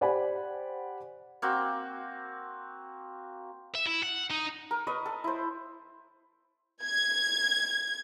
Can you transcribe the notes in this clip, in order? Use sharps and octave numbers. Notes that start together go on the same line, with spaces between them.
G4 C5 D5 F#5 G#5 B5
A#3 C4 F#4
E5
E4
F#5
D#4
A#4
B4 D#5 C#6
A4
E4 C5
G#6